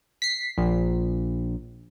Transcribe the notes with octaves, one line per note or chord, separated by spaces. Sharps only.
B6 C7
A#1